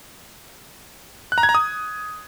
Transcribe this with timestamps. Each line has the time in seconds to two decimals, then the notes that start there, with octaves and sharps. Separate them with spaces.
1.32 F#6
1.38 A#5
1.43 G#6
1.49 A#5
1.55 D#6